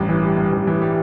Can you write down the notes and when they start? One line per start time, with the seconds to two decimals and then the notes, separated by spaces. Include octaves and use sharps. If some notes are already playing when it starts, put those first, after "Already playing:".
Already playing: A1 G2
0.09 E3
0.23 G3
0.38 G2
0.52 A1
0.67 E3
0.82 G3